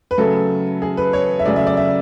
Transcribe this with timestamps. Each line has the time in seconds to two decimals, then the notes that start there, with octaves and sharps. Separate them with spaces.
0.11 B4
0.18 C#3 F#3 A3 A4
0.82 G#4
0.97 B4
1.13 C#5
1.39 E5
1.46 C#3 F#3 A3 D5
1.56 E5
1.67 D5
1.77 E5